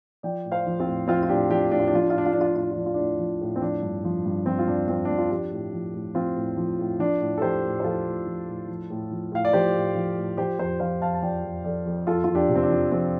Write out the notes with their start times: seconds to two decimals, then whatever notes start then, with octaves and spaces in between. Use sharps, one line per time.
0.23 F3 D5 G5
0.45 A2
0.52 C5 F5
0.66 F3
0.80 C4 F4
0.87 A2
1.08 F3 C4 F4
1.23 F4
1.29 A2 D4 G4
1.50 F3 D4 G4
1.71 A2 D4
1.79 F4
1.87 D4
1.93 F3 F4
2.02 D4
2.10 F4
2.14 A2 D4
2.26 F4
2.33 F3 D4
2.41 F4
2.48 D4
2.56 A2 F4
2.63 D4
2.71 F4
2.77 F3 D4
2.86 F4
2.94 A2 D4
3.19 F3
3.41 A2
3.56 C4
3.62 F3 D4
3.83 G2
4.04 F3
4.26 G2
4.46 F3 C4
4.59 F4
4.68 G2 D4
4.88 F3 C4 F4
5.05 D4
5.10 G2
5.18 F4
5.31 F3 D4 G4
5.51 A2
5.73 F3
5.94 A2
6.15 F3 C4 F4
6.37 A2
6.57 F3
6.79 A2
6.99 F3 D4
7.21 A2
7.38 A4
7.42 F3 G4 C5
7.64 A2
7.80 C5
7.84 F3 F4 A4
8.05 A2
8.27 F3
8.48 A2
8.68 F3
8.90 A2
9.11 F3
9.32 A2 F5
9.45 D5
9.53 F3 G4 C5
9.75 A2
9.95 F3
10.17 A2
10.37 F3 G4 C5
10.59 F2 G4 C5
10.80 F3 C5 F5
11.01 F2 F5 A5
11.14 A5
11.22 F3 D5 G5
11.44 F2
11.64 F3 A4 D5
11.86 F2
12.07 F2 F4 A4
12.24 F2 F4
12.35 D4 G4
12.49 C3
12.56 C4
12.63 D4
12.70 F3
12.92 F2 C4